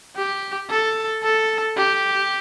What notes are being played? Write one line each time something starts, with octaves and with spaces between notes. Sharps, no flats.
G4
A4
A4
G4